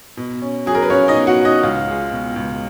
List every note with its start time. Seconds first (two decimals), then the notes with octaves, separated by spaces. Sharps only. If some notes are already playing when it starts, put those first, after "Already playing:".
0.17 B2
0.42 C#4
0.66 F#3 G#4
0.75 A#4
0.82 B4
0.90 C#4 F4 C#5
1.08 D#4 D#5
1.15 B2
1.27 F#4 F#5
1.39 C#4
1.45 D#4 D#5
1.63 C#2 F4 F5
1.88 G#3
2.11 B2
2.36 C#2